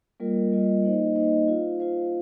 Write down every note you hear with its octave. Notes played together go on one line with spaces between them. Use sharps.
G3 A#3 F4 A#4 D#5
G3 A#3 F4 A#4 D#5
A#3 D#4 C5 D#5
A#3 D#4 C5 D#5
F4 C5 F5
F4 C5 F5